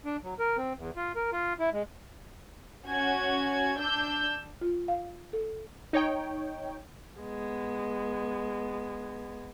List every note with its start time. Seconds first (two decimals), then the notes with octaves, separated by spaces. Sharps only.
0.05 D4
0.23 F#3
0.39 A#4
0.58 C4
0.77 E2
0.96 F4
1.16 A#4
1.33 F4
1.60 E4
1.73 G#3
2.87 C#4 F#4 G#6
3.79 D4 E6 G6
4.61 F4
4.88 F5
5.33 A4
5.93 D#4 C#5 G5
7.20 G#3 B3